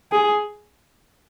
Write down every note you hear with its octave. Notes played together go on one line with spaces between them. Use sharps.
G#4